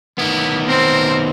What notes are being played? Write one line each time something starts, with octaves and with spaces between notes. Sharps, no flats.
D#3 B3 E4
C4 A#4